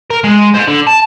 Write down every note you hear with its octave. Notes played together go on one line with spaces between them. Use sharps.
A#4
G#3
C5 D#5
D3
A5